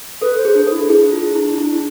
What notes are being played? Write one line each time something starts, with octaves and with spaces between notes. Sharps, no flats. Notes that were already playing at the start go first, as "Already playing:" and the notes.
A4 B4
C5
G#4
D4
A4
E4
D4 G#4
F4
E4
E4